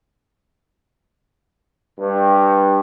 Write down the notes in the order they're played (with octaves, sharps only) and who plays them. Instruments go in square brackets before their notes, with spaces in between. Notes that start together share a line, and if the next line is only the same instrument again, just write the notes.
[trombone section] G2